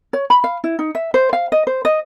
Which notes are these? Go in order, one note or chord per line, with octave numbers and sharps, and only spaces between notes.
C#5
B5
F5
E4
D#4
E5
C5
F5
D#5
C5
D#5